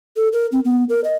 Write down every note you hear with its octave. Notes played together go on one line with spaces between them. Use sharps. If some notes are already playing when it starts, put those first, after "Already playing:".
A4
A#4
C4
B3
A#4
D#5